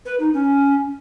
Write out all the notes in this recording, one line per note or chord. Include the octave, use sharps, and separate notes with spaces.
B4
D#4
C#4